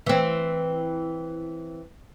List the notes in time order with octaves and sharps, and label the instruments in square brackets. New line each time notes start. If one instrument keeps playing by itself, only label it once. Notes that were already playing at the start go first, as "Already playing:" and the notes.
[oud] E3 C4